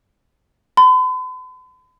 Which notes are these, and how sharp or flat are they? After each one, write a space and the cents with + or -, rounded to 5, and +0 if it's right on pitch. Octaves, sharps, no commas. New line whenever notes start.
B5 +45